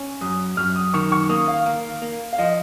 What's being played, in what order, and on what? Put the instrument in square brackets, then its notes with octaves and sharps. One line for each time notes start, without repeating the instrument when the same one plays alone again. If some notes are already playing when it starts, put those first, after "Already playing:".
Already playing: [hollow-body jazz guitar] C#4
[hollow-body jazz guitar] F#2 [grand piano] D#6
[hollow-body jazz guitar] F#2 [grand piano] F6
[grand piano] D#6
[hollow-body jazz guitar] D#3 [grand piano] C#6
[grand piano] C#6
[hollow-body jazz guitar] A#3 [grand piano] D#6
[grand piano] F5
[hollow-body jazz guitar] A#3
A#3
[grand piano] F5
[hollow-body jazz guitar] F3 [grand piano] D#5